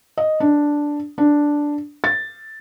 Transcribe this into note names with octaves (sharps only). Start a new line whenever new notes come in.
D#5
D4
D4
A6